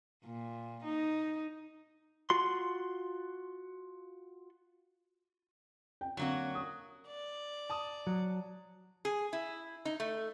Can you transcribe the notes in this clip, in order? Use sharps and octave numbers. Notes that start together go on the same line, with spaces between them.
A#2
D#4
F4 F#4 C6
G5
D3 F#3 A#3 C4 F#4
D#6
D5
A5 D#6
F#3
G#4
E4
D#4
A3